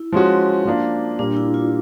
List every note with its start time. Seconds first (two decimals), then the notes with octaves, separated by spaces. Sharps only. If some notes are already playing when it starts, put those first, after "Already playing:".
Already playing: E4
0.12 F3 G#3 C#4 F#4
0.66 F3 A#3 D4 F4
1.19 A#2 G3 A#3 D4
1.37 E4
1.54 F4